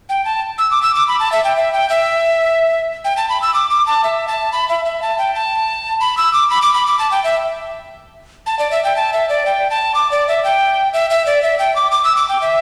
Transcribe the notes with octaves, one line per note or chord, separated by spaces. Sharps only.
G5
A5
E6
D6
E6
D6
B5
A5
E5
G5
E5
G5
E5
G5
A5
B5
E6
D6
D6
A5
E5
A5
B5
E5
E5
A5
G5
A5
B5
E6
D6
B5
D6
B5
D6
A5
G5
E5
A5
D5
E5
G5
A5
E5
D5
G5
A5
D6
D5
E5
G5
E5
E5
D5
E5
G5
D6
D6
E6
D6
G5
E5